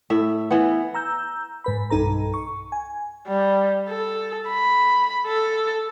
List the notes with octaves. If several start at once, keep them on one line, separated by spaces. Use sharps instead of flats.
A2 E5
E3 B3
A#5 E6 G6
G#2 B4 B5
B1 G2 D#4 A4 A#5
C#6
G#5
G3
A4
B5
A4